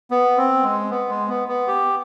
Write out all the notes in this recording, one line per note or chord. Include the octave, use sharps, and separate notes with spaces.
B3
C4
G#3
B3
G#3
B3
B3
G4